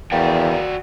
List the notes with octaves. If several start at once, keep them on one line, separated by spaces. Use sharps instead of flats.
E2 A#3 F#4 D5 G5